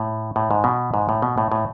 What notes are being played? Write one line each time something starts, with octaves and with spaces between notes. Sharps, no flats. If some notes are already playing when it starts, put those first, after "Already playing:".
Already playing: A2
A2
G#2
B2
G#2
A2
B2
A2
A2